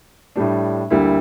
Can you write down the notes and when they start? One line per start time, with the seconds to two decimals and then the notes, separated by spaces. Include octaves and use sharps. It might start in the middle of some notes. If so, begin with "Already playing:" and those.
0.36 A2 G3 D4
0.90 D2 D3 G3 A#3 E4